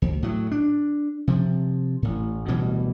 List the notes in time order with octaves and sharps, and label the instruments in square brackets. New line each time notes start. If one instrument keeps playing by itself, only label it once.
[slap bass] D2
A2 F#3
D4
C3 F3
A1 A2
D1 B2 E3 G3